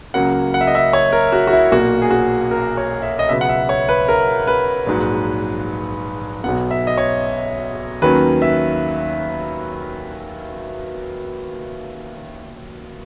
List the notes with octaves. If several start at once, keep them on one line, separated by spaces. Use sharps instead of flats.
C#2 C#3 F#3 A#3 C#4 F#5
F#5
E5
D#5
E5
C#5
A#4
F#4
F#4
E4
B1 A#2 A#3 F#4
G#4
F#4
A#4
C#5
E5
D#5
C#2 B2 F#3 B3 E5
F#5
E5
C#5
B4
A#4
B4
A#1 G#2 F#3
B1 B2 F#3 B3 F#5
E5
D#5
C#5
D#2 D#3 F#3 C#4 B4
E5